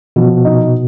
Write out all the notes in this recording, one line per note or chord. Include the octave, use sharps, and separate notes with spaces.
B2 F3
D#4